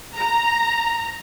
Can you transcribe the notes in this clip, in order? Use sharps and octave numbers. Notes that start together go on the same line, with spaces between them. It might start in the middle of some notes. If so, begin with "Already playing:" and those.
A#5